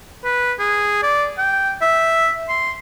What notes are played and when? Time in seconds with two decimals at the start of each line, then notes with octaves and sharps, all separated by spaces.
0.24 B4
0.59 G#4
1.03 D5
1.38 G5
1.82 E5
2.49 C6